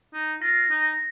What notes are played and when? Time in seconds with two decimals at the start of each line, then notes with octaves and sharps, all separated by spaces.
0.14 D#4
0.42 F4 A#6
0.70 D#4